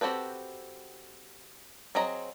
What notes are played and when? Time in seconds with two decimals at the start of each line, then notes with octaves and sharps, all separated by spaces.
0.01 C4 F#4 G4 A4 B4
1.95 F#3 C4 G#4 D#5 A#5